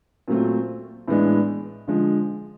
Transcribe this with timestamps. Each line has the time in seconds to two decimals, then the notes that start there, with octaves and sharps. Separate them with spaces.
0.28 A#2 F#3 A3 C4 F4
1.08 A2 E3 G#3 B3 D4
1.87 D3 F3 G#3